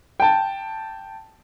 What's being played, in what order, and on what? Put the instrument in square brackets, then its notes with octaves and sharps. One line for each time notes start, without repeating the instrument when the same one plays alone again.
[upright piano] G5 A5